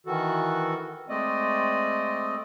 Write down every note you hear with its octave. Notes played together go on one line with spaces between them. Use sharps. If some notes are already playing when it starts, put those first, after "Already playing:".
D#3 E3 F#4 A4
G#3 A3 C4 D5 D#5